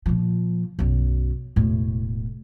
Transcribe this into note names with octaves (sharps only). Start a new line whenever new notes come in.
A#2 F3
B1 F#2
E1 A2